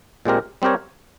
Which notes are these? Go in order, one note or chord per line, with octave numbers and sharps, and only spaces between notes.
A#2 G#3 C4 G4 A#4
G3 C4 G4 A#4 C#5